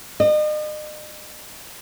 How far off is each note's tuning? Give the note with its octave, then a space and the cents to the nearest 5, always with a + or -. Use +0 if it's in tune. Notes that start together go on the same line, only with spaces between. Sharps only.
D#5 -40